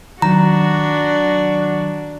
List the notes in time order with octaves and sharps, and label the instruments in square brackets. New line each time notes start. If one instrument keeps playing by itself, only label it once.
[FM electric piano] D#3 F#3 [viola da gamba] D4 F#4 [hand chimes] A#5